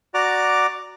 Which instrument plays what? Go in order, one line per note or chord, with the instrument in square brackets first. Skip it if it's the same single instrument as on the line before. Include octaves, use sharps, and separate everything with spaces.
[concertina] F#4 D5 A#5 D6